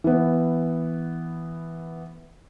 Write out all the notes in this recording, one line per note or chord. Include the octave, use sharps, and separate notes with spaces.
E3 B3